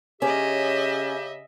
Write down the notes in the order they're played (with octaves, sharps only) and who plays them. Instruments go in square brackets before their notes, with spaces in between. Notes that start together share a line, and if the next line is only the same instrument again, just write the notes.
[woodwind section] C#3 G4 [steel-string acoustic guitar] C#4 [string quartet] D#5 E5